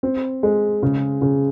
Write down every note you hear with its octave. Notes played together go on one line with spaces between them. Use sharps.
C4
G#3
C#3
C#3